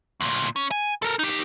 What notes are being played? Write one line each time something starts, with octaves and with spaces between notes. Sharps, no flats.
D2 A#2
C#4
G#5
A4 A#4
D#4 G4